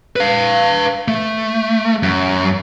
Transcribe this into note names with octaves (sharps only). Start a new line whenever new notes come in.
B4 F5
A3
F#2